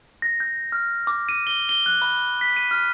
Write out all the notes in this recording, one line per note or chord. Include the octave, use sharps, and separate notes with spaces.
A#6
G6
F6
D6
D#7
G7
G7
F#6
B5
B6
D#7
F6